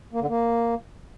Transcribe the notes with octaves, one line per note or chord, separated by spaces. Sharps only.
A#3
D3
A#3